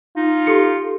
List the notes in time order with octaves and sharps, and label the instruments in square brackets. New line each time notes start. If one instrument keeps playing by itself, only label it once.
[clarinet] D#4 [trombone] F4
[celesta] G4 A4 C#7